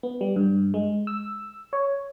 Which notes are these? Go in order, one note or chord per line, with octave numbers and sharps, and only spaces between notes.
B3
G3
G2
G#3
E6
C#5